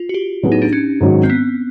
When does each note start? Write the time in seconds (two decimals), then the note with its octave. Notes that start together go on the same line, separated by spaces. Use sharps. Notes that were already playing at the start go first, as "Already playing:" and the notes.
Already playing: F4
0.09 F#4
0.14 G4
0.43 A2 F#3 B3 E4 G#4
0.52 D#4
0.62 D4
0.73 C#4
1.01 G#2 D#3 F#3
1.23 C4
1.30 B3